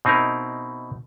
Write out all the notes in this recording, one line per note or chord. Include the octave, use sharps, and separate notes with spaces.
B2 C4 D#4 E4 A#4